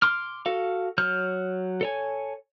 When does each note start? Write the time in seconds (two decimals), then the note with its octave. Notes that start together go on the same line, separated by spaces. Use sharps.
0.02 C6 D6 F6
0.46 F#4 A4 F5
0.98 F#3 C#5 F6 G6
1.81 A4 C#5 G#5